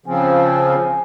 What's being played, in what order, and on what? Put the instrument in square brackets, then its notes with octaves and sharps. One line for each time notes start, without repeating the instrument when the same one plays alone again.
[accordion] C#3 F3 C4 [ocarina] G#5